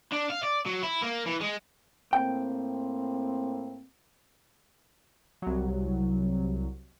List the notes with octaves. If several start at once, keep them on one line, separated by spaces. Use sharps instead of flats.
D4
F5
D5
F#3
E4
A#3
E3
G#3
A2 A#3 C4 G5
C2 F#3